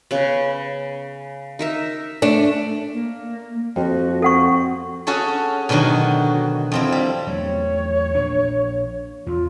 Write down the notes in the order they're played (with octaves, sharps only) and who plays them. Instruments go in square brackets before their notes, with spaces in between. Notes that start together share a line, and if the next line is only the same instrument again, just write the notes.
[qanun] C#3 B3
D#4 A#4 E5
[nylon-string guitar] A3 D4
[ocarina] A#3
[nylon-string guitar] F2 [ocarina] F#4
[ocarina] C4 [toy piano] A4 F#5 C#6
[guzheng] C#4 F#4 G#4 A4 C#5
B2 D3 D#3 F#3 F#4
F2 C4 E4
G3
[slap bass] E2 F#3 A3 [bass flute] C#5
[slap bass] A#1 D4
[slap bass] E2 [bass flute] F4